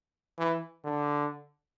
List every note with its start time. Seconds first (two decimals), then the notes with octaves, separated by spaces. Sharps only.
0.39 E3
0.84 D3